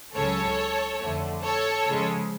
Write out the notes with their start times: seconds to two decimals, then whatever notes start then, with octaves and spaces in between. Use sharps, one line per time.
0.15 C#2 C#3 F#3 A4 C#5
1.01 F2 D3 F3 A3
1.43 A4 C#5
1.86 C#3 F3 G#3